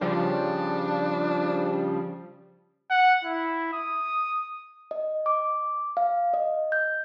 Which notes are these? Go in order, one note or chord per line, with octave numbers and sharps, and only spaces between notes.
C#3 F3 G3 D4
F#5
E4
D#6
D#5
D6
F5
D#5
G6